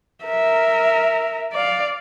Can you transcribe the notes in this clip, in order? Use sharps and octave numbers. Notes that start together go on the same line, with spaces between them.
A#4 E5
D5 F5